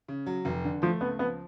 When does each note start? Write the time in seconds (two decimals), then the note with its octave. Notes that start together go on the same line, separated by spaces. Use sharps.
0.08 C#3
0.26 F#3
0.45 F1
0.64 D3
0.82 F3 A3
1.00 C#2 B3
1.19 F3 B3